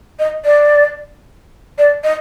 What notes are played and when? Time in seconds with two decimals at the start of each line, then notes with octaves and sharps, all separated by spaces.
0.19 D#5
0.45 D5
1.78 D5
2.04 D#5